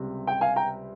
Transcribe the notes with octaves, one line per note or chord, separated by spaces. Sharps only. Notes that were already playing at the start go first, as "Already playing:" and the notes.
Already playing: C#2 C3 G3
G5
F5 G#5
G5 A#5